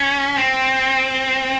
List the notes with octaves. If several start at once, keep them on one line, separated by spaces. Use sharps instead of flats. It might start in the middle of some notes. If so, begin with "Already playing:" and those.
Already playing: C#4
C4